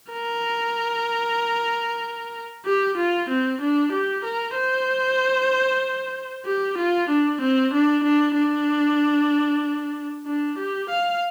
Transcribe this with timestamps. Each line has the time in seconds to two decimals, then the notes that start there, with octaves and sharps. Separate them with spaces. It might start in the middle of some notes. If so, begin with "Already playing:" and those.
0.13 A#4
2.65 G4
2.97 F4
3.29 C4
3.61 D4
3.92 G4
4.24 A#4
4.55 C5
6.45 G4
6.78 F4
7.09 D4
7.41 C4
7.73 D4
8.04 D4
8.35 D4
10.26 D4
10.58 G4
10.89 F5